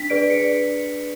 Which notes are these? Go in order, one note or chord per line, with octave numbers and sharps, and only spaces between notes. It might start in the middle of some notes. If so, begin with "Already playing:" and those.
Already playing: D4 B6
G#4 B4 D5 D7
C#7